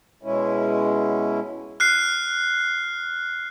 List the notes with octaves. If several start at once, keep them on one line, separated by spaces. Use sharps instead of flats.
B2 G#3 C#4 E4
F6 F#6 C7